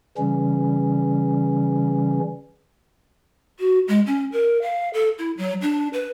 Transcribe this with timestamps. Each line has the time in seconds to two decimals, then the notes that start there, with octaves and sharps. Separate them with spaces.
0.18 C#3 E3 G3 C#4
3.60 F#4
3.88 G#3
4.07 C#4
4.32 A#4
4.62 F5
4.94 A4
5.19 E4
5.37 F#3
5.62 D4
5.93 B4